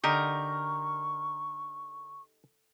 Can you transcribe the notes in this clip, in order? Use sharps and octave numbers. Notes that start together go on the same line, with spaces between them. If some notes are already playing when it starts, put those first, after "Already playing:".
D3 D#4 G4 A#4 D#5 C#6